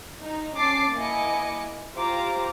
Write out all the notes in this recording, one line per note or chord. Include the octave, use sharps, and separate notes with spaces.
D#4
C#4 A5 D6 A6 C7
A#3 E4 D#5 G#5 D6 C#7
F4 G4 C5 F5 A#5 D6